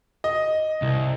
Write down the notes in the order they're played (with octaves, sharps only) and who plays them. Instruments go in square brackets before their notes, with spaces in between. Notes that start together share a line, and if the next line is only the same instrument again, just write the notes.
[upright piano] D#5
[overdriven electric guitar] C2